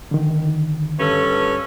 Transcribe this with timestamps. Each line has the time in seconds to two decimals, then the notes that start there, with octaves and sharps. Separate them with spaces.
0.11 D3 D#3
0.98 G2 C#4 A4